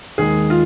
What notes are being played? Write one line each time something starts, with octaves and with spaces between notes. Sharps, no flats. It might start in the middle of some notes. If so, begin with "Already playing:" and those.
D#2 D#3 G#3 G#4
F4